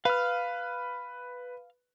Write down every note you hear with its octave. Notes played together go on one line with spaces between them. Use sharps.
B4 F5 F6